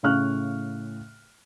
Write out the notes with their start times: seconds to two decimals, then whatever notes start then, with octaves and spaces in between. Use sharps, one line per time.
0.03 A2 C#3 F5 C#6 F6 F#6